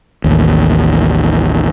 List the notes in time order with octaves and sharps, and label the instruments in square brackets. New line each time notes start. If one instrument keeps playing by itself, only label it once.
[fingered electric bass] A1 D#2